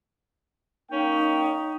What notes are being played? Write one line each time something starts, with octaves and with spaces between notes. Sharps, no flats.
A#3 C#4 D#4 G5